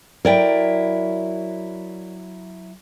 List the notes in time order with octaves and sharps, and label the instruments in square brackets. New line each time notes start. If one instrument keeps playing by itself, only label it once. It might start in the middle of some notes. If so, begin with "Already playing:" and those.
[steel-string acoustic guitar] F#3 E4 [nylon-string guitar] A#4 D5 G5